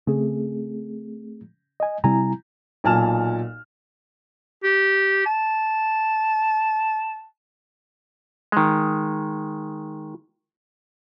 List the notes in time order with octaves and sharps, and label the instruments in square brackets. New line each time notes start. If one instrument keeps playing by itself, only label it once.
[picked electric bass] C#3 [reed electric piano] A3 C4 G#4
[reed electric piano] D#5 G#5
[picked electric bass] C3 G3 C4 [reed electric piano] E4 G#5 A#5
[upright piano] B1 A#2 G#5 A5 F6 E7
[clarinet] G4
A5
[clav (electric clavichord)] D#3 G#3